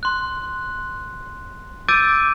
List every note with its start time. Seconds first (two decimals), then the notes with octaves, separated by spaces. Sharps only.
0.03 C6 F#6
1.88 D6 E6 G6 A6 D7 D#7